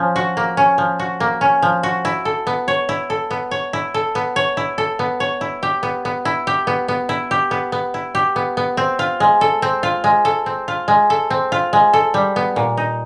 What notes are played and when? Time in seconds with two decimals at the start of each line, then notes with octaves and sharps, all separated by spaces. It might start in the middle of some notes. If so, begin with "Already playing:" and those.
Already playing: F3 C#4
0.16 F#4
0.37 A#3
0.57 C#4
0.78 F3
0.99 F#4
1.20 A#3
1.41 C#4
1.62 F3
1.83 F#4
2.05 E4
2.25 A4
2.47 B3
2.68 C#5
2.89 E4
3.10 A4
3.31 B3
3.51 C#5
3.73 E4
3.94 A4
4.15 B3
4.36 C#5
4.57 E4
4.78 A4
4.99 B3
5.20 C#5
5.41 E4
5.63 G4
5.83 B3
6.05 B3
6.25 E4
6.47 G4
6.67 B3
6.88 B3
7.09 E4
7.31 G4
7.51 B3
7.72 B3
7.94 E4
8.15 G4
8.36 B3
8.57 B3
8.77 C4
8.99 F4
9.20 G#3
9.41 A4
9.62 C4
9.83 F4
10.04 G#3
10.25 A4
10.46 C4
10.68 F4
10.88 G#3
11.10 A4
11.30 C4
11.52 F4
11.73 G#3
11.94 A4
12.14 G3
12.36 B3
12.56 A#2
12.77 D#4